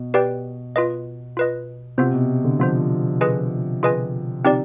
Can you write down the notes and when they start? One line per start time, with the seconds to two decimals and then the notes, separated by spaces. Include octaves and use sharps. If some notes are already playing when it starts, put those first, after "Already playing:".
Already playing: B2
0.14 G4 B4 D5 G5
0.76 F4 B4 D#5
1.37 F4 B4 D#5
1.98 C3 B3 F4 C5
2.13 B2
2.44 D3
2.59 F3 B3 F4 C5
3.21 F4 G#4 B4 D#5 G#5
3.83 F4 G#4 B4 D#5 G#5
4.45 C4 D#4 G4 D5